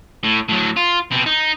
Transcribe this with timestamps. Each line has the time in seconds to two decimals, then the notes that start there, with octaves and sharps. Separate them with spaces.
0.24 A2
0.49 A2 F#3
0.77 F4
1.12 B2 C4
1.26 D#4